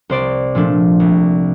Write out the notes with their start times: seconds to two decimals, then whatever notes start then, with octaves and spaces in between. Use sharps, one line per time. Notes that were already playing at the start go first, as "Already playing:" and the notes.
0.10 C2 C5 D5
0.55 A#2 F3 A3 D4
1.00 C2